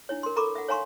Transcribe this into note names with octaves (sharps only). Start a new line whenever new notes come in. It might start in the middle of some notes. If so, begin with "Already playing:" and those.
D4 E4 C#5
A#4 C6
A4 A#4 A#5 B5 C#6 D6
E5 F#5
C#5 F5 G#5 A#5 C6 C#6